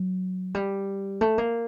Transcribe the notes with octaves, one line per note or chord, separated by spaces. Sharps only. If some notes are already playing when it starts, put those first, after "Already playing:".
Already playing: F#3
G3
A3
A#3